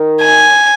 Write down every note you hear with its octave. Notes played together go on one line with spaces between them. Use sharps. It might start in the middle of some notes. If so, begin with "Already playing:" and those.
Already playing: D#3
G#5